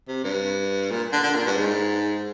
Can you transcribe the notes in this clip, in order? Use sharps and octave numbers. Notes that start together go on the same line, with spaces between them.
C3
G2
A#2
D3
D3
A#2
G2
G#2